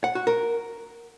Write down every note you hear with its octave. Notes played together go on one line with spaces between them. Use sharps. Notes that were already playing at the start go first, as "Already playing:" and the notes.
F#5
F#4
A#4